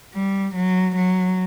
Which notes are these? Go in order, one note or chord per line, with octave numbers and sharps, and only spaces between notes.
G3
F#3
F#3